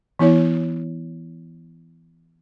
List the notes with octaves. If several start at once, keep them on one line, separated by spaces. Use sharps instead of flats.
E3 B3 E4 C#5